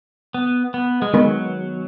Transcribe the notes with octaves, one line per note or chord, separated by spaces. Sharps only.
B3
B3
G#3
D#3 F#3 G#3 B3